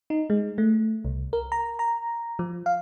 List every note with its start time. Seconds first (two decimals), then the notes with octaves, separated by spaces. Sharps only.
0.10 D#4
0.30 G#3
0.58 A3
1.05 C2
1.33 A#4
1.52 A#5
1.79 A#5
2.39 F3
2.66 F5